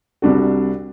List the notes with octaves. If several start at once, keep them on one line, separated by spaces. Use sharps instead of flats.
C2 C3 G3 D4 F#4